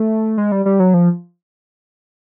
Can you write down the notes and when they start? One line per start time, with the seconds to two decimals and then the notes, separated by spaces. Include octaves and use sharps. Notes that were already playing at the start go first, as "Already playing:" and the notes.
Already playing: A3
0.38 G#3
0.52 G3
0.65 G3
0.80 F#3
0.94 F3